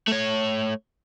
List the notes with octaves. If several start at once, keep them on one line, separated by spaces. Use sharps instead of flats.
A3 C#5